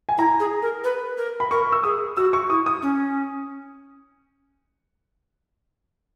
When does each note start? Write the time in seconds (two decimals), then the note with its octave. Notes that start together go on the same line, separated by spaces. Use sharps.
0.09 G#5
0.18 E4 A#5
0.40 G#4
0.62 A#4
0.84 B4
1.18 A#4
1.40 B5
1.51 A#4 C#6
1.72 E6
1.83 G#4 D#6
2.17 F#4 E6
2.33 C#6
2.50 E4 D#6
2.66 D#6
2.82 C#4